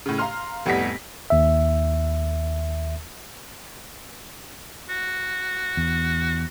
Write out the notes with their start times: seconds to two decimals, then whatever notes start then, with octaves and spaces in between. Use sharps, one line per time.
0.06 A2 C#3
0.18 F5 A#5 C6 F6
0.66 F1 A2 G3 B3 A#6 B6
1.30 D#2 E5
4.89 F#4
5.77 E2